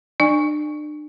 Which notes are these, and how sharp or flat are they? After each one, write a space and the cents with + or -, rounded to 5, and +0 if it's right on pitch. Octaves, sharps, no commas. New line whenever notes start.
D4 +40 D5 +35 G#5 -20